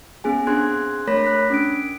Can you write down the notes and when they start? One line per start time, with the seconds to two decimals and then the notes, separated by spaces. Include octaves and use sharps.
0.24 B3 C#4 G#4 G#5
0.47 C4 D4 G#4 C6 F#6 G#6
1.07 A3 A#4 C#5 B5 A#6 B6
1.24 F#6 B6
1.50 C#4 D4 D7